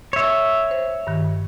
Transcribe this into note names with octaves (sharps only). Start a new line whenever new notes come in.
C#5 E5
C5
G2 D#3